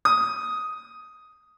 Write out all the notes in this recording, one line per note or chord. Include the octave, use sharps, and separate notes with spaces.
D#6